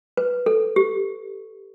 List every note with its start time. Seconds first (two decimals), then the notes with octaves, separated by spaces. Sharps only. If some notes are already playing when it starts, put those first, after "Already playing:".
0.17 B4
0.46 A4
0.76 G4